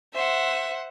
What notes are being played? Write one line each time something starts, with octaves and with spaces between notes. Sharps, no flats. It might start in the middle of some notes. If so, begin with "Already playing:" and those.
C5 E5 F#5